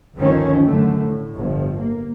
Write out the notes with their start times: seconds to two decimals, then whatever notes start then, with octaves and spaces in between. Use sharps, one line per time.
0.17 G1 D2 D#3 F3 C4 C#4
0.65 F#2 D3 A3
1.04 A2
1.37 G1 F3
1.77 A#3